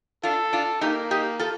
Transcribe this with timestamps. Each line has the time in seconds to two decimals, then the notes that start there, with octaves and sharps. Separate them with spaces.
0.23 D4 F4 A4
0.53 D4 F4
0.81 A#3 D#4 G4
1.11 D#4 G4
1.39 F4 A4